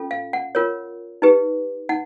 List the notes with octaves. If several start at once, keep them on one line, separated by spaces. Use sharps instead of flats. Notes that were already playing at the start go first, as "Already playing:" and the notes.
Already playing: C#4 F4 A4
F5
F#5
F4 A#4 C#5
D#4 G4 B4
D#4 F#5